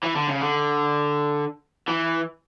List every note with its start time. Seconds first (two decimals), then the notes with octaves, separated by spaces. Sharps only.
0.03 E3
0.15 D3
0.28 C#3
0.41 D3
1.88 E3